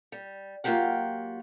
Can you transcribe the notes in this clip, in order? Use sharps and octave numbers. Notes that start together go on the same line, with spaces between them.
G3
F#3 A#3 D4 F4 G4 F#5